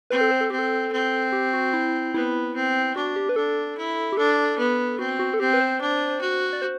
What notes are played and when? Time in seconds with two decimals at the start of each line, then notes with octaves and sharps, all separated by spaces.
0.10 C4 B4
0.21 A4
0.31 C5
0.41 A4
0.50 C4 G4
0.59 A4
0.92 C4
1.32 G4
1.54 F#4
1.73 E4
2.14 B3 E4
2.55 C4
2.96 D4 F#4
3.16 G4
3.29 B4
3.36 D4 A4
3.77 E4
4.12 G4
4.17 D4 A4
4.58 B3
4.99 C4 F#4
5.19 F#4
5.34 A4
5.40 C4 G4
5.53 B4
5.61 C5
5.81 D4
6.21 F#4
6.53 D5
6.62 C5